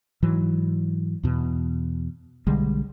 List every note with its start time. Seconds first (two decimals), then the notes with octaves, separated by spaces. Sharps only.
0.22 G#2 E3 F#3
1.23 E2 B2
2.47 B1 D3 G3 G#3